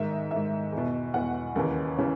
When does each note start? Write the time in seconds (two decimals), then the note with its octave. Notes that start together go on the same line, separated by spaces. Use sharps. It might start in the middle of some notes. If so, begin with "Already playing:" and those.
Already playing: G#2 D#3 E5
0.11 D#5
0.31 G#2 D#3 E5
0.72 E2
0.78 B2
1.14 E2 B2 F#5
1.55 D#2 C#3 E3
1.97 C#3 E3 C#5